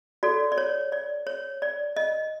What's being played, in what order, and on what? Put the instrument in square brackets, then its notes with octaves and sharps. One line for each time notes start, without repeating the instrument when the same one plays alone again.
[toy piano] F#4 A4 C#5 D5
D5
C#5
D5
C#5
D5
D#5